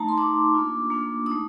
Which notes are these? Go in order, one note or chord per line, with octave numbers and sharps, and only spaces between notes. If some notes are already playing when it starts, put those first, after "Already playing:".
Already playing: A3 D#4 A5 A#5
C6
A3 D#4 D6
A#3 D4 F4
A#3 D4 F4
D#4 D#6
A3